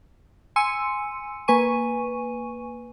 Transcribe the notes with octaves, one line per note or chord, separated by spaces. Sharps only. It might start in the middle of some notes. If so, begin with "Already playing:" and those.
G#5 C6 E6 C#7 D#7
A#3 B4 G#5 C#6 D#7